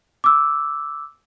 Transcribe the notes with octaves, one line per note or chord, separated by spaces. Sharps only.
D6 E6